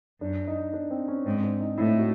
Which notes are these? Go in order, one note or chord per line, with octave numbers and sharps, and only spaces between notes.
F#2 D4
D#4
D4
C4
C#4
G#2 C4
D4
D#4
A2 E4
F#4